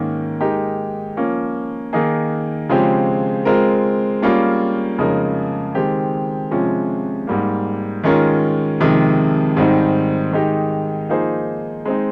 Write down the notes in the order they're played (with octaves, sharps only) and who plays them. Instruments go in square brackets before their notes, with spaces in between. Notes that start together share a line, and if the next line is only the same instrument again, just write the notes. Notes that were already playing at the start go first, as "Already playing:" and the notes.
Already playing: [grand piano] G#2 D#3 A#3 C#4
G#3 D#4 G4 A#4
F3 A#3 C#4
D#3 A#3 D#4 G#4
C#3 F3 G#3 C4 G4
G#3 C4 F4 A#4
G3 A#3 C#4 F4 G#4
F2 C#3 G#3 D#4 A#4
D#3 G#3 C4 G4
C3 F3 G#3 C#4
G#2 G3 A#3
D#3 G#3 C#4 F4 A#4
F2 C3 D#3 G#3
G#2 D#3 G3 C4 D#4
D#3 G#3 D#4 G4
F3 A#3 D#4 G#4 C5
G#3 C4 D#4